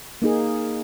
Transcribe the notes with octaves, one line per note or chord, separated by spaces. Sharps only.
A#3 D#4 G#4